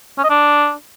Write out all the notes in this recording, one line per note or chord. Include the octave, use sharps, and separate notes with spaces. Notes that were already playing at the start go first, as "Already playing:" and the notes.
C#4
D#5
D4